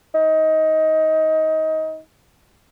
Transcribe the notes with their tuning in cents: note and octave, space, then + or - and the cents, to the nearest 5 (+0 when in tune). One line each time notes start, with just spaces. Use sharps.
D#4 +20